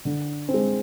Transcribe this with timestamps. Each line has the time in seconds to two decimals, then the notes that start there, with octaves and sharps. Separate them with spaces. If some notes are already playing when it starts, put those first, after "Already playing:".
0.05 D3
0.49 C4
0.54 G#3